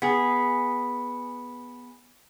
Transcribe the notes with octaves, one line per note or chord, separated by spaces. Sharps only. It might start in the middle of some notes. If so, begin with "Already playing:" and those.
B3 G#4